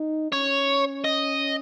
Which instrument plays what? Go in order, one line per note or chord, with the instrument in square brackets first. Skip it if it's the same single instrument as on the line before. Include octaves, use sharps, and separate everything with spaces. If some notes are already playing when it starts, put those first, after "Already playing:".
Already playing: [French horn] D#4
[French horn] C#4 [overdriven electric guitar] C#5
[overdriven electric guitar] D#5